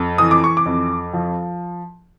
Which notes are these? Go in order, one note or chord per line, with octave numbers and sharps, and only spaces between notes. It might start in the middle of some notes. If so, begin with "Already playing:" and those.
Already playing: F2
E3 D#6
D6
C#6
D6
F2
F3